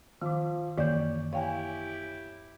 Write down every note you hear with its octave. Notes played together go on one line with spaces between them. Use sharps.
D#3 F3 D6
F#2 D#3 E3 A#3 C#5 D5 G6
E4 G4 C#5 F5 G5 G#5